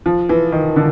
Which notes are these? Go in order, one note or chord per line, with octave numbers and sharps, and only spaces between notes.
F3
E3
D#3
D3